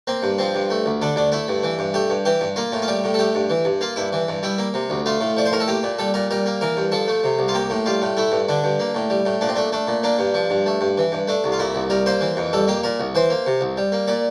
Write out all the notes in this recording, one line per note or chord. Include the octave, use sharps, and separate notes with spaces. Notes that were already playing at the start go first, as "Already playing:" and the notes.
A#3 C4
G2
F3 C4
G2
A3
D2
D3 D4
D2 D4
A3 E4
G2
E3
G2
A3 G4
G2
E3 G4
G2
A#3 F4
A2
F4
G3 G4
A2
A4
A3 G4
G2
E3
G2
A#3 F4
G2 E4
E3
G2
G3 E4
A#3
C3
D2
A3 F4
A2
F3 D5
C5
A2 A#4
A4
A#3 G4
A#2
G3 A4
A#2 A#4
G3 A#4
A#3
E3 A#4
G2
F3 A4
A3
C3
C2
F4
A#3 G4
A2
G3 F4
A2
A3 E4
G2
D3 D4
G2
A#3
A2
G3
A2
A#2 D4
C4
A3 D4
A3 D4
A#2
A#3 D4
G2
F3
G2
A3
G2
E3
G2
A3 D4
C2
F4
A#2 E4
C2
G3 A#4
A#3 C5
E3
F2
G3 A4
A#3 G4
A#2 A#4
C2
E3 C5
A#3
C3
C2
G3
A#3
A#2 D5